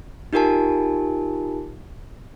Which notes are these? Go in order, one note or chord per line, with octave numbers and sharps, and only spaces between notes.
D#4 F4 G4 A#4 G#5 A5